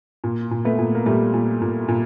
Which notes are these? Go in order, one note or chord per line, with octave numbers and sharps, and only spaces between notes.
A#2
A#2
A3 B3
A#2
A#3
A#2 G3 A3
A#2
A#2
A#2